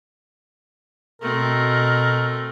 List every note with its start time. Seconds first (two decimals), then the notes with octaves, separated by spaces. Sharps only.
1.22 B2 A3 C4 A#4